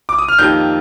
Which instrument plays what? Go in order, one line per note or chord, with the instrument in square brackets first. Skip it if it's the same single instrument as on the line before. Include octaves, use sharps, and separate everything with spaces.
[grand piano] D6
D#6
F6
[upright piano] F2 D#3 A#3 D#4 G4 [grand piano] G6